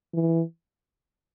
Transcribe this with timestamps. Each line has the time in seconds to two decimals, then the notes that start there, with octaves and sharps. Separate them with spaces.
0.14 E3